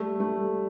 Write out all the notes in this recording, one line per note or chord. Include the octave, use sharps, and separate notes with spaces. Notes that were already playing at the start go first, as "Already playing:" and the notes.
Already playing: G3 A3
A3